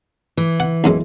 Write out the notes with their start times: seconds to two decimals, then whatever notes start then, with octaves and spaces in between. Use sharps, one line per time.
0.37 E3
0.60 F#5
0.84 B1 F#2 G#3